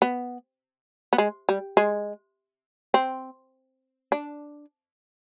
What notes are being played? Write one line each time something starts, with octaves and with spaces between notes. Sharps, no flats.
B3
B3
G#3
G3
G#3
C4
D4